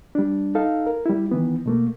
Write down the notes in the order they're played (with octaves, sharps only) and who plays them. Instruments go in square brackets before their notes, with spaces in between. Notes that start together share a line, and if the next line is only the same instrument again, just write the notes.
[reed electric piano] G3 D4
D#4 A4 F5
A#4
G3 E4
D#3 E3 B3
B2 A3 A#3